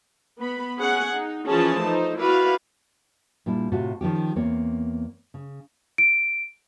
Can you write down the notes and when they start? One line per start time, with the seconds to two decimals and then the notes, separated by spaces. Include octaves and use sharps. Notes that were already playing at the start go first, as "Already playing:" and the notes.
0.40 B3 B5
0.80 C#4 G#4 F#5
1.15 D#4
1.48 E3 F3 C#4 F4 G#4 A5
1.83 A3 D#4 C5
2.19 E4 F#4 B4 D5 F5
3.46 A#2 G3 D4 E4
3.72 A2 C3 F4 F#4
4.01 D#3 F3 C#4 G4
4.36 E2 A#3 C4 C#5
5.34 C#3
5.98 D7